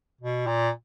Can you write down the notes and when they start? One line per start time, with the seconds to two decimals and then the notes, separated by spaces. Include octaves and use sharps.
0.21 B2
0.47 A#2